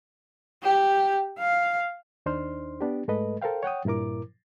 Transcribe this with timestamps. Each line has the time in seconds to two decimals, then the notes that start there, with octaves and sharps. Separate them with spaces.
0.63 G4
1.39 F5
2.26 D#2 D4 D#4 C5 C6 F6
2.81 B3 D4 G4
3.08 G#2 G#3 A3 A4 B4 D#5
3.42 A4 A#4 C5 F5 G5
3.63 C#5 F#5 G5 D#6
3.85 G2 A#2 E4 A#4 D6